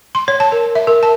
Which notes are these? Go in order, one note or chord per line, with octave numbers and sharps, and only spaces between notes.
C6
C#5
A5
A#4
E5
A#4
A5